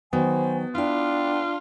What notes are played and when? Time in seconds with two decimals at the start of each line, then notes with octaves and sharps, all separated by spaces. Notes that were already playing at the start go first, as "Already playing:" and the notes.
0.13 D#3 F#3 B3 C5 G#5
0.75 D4 E4 F4 G5